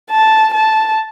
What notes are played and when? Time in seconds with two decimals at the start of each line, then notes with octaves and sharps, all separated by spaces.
0.11 A5
0.54 A5